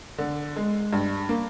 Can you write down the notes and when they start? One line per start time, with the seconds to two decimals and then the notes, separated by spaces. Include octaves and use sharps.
0.18 D3
0.56 G#3
0.93 G2
1.29 A#3